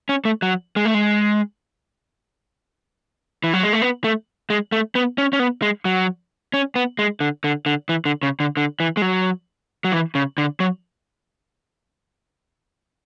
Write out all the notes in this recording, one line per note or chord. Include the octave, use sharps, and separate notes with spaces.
C#4
A3
F#3
G#3
A3
G#3
E3
F#3
G#3
A3
B3
A3
G#3
A3
B3
C#4
C#4
B3
G#3
F#3
C#4
B3
G#3
D3
D3
D3
E3
D3
C#3
D3
D3
E3
G#3
F#3
F#3
E3
C#3
D3
F#3